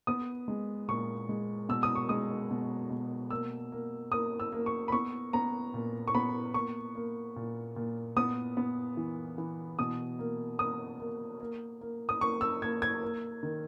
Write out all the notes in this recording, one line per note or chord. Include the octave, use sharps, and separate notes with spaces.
B3 D#6
G#3
A#2 C#6
G#3
B2 E6
D#6
C#6
G#3 D#6
B2
B2
A#3 E6
A#3
A#3 D#6
E6
A#3
C#6
B5
B3 C#6
B3 A#5
A#2
C#6
B3 B5
A#3 C#6
A#3
A#2
A#2
B3 D#6
B3
E3
E3
B2 D#6
A#3
A#3 D#6
A#3
A#3
A#3
D#6
A#3 C#6
E6
A#3 G#6
G#6
A#3
D#3